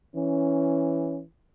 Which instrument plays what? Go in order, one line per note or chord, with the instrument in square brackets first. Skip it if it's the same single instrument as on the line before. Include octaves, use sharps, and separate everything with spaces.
[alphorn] E3 [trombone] C#4